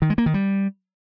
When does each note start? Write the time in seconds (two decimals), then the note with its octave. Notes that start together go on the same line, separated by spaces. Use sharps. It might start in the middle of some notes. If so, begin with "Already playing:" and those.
0.02 D#3
0.10 G#3
0.18 A#3
0.26 D#3
0.34 G3